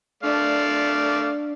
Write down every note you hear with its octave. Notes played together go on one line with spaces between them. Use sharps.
A3 D4 D5 F5